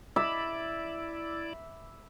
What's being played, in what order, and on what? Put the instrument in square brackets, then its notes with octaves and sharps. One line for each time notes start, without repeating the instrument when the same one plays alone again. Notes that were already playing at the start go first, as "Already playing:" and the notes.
[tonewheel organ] E4 D5 [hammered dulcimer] E5 B5 D6